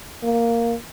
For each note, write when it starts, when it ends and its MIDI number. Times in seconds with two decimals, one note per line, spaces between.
0.23 0.74 58